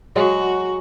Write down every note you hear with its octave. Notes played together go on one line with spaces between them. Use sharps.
F#3 G#3 F#4